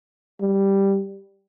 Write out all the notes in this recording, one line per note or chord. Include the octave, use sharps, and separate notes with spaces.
G3